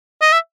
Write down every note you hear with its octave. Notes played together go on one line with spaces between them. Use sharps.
D#5
E5